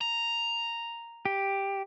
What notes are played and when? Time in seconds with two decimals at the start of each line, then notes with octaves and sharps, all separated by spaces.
0.01 A#5
1.25 G4